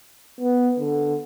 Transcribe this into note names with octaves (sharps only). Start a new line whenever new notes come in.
B3
D3